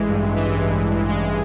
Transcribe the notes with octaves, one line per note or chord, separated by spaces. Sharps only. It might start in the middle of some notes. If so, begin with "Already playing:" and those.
Already playing: A1 E3 G#3
G2
A1
E3
G#3
G2
A1
E3
G#3